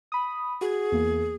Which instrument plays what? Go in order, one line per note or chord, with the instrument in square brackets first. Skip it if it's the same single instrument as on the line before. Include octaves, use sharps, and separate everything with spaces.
[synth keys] B5 D#6
[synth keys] F#4 [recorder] G#4
[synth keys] E2 A#3